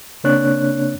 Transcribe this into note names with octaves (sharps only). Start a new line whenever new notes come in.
C#3 A#3 C4 D4 C#5 F#6